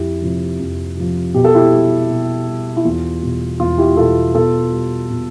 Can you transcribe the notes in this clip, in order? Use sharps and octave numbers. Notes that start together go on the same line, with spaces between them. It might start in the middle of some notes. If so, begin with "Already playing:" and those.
Already playing: F2 E4 G4
C3 F3
F2
C3 F3
B2 G4
A4
E4 G4
G3
B2
G3
E4
E2 F4
B2 G3
E2 F4
E4 G4
B2 G3 F4 A4
B2 F4 A4
G3
B2